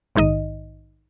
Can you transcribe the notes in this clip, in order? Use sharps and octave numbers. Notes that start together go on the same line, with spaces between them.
A#1 G#2 D#3 D#4 D#5